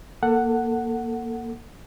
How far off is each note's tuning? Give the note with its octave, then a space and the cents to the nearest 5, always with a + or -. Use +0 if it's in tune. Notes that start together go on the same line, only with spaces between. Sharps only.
A#3 +10 A4 +25 F#5 +0